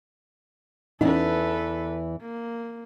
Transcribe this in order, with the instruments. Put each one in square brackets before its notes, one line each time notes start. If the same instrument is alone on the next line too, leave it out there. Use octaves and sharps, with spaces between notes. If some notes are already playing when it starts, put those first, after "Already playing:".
[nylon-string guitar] E2 E3 [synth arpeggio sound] C#4 D#4 [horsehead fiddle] A4 B4
[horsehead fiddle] A#3